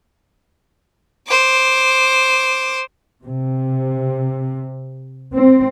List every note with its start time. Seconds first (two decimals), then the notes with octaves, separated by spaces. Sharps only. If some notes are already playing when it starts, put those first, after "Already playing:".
1.27 C5 D6
3.23 C3
5.34 C4